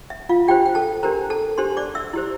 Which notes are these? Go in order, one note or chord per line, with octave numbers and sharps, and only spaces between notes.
E5
F4 F5
D4 F4 G4 C5 G5
G5
A4 A5
D4 G4 A#4 C5 A#5
A4 A5
D4 G4 C5 C6
D5 D6
E5 E6
E4 G4 C5